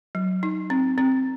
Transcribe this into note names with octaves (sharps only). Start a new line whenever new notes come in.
F#3
D#4
C4
C4